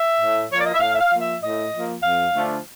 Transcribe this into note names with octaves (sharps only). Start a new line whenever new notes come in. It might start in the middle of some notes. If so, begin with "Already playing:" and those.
Already playing: E5
A2
F3 A#3 C#5
D5
D#5
E5
A2 F5
E5
F5
F3 A#3
E5
A2 D#5
F3 A#3
F2 F5
D3 F3 A3 D4